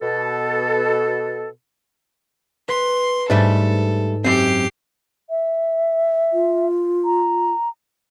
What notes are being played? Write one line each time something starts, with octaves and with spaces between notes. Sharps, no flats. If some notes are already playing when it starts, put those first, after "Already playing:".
B2 A4
B4 C6
G#2 G3 A3 D4 A4
F#2 C4 G4 C7
E5
F4
A#5